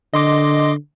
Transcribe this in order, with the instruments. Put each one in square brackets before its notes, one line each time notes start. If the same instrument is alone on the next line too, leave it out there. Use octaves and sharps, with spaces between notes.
[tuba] D3 [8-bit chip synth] D#5 C6 D6